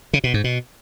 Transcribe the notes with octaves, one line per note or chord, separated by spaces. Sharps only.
C#3
B2
G#2
B2